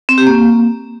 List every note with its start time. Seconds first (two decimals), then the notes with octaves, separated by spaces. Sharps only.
0.09 C4
0.18 G4
0.27 A#3